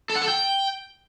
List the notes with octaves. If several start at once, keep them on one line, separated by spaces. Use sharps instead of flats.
A4
F#5
A4
G5